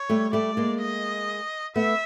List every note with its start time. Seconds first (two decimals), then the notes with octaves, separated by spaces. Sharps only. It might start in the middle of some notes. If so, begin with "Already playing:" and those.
Already playing: C#5
0.09 G3 A3
0.33 G3 A3 D5
0.57 G#3 A#3
0.81 D#5
1.76 A3 B3 E5